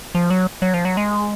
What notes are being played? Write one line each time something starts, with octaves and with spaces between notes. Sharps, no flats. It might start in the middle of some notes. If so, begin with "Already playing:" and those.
F3
F#3
F#3
F3
F#3
G#3